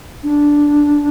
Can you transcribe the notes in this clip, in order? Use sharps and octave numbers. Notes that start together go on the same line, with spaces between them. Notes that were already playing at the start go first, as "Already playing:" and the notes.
D4